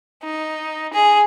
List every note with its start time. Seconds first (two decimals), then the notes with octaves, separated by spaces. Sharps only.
0.24 D#4
0.93 G#4